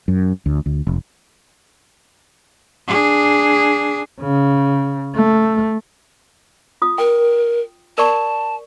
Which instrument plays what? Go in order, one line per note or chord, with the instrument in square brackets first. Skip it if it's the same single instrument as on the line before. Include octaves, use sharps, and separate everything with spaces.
[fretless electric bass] F#2
D2
D2
F1
[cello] D4 G#4
[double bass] C#3
A3
[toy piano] F4 D#6
[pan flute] A#4 [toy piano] G5
[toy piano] A#4 D5 C#6 [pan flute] A5